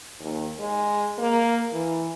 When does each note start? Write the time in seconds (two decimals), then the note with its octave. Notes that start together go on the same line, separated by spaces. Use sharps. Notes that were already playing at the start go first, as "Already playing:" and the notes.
0.20 D#2
0.59 G#3
1.18 A#3
1.73 E3